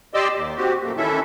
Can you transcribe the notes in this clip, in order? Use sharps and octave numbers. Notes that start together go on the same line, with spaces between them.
G4 D5 D#5 C6 D6 E6
D#2
C4 F#4 G4
F#2 A#2 A3 A#3
D#3 E3 C#4 E4 A4 E5